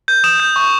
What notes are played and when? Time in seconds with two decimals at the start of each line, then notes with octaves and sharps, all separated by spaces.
0.08 G6
0.24 D#6 E7
0.40 G6
0.56 C#6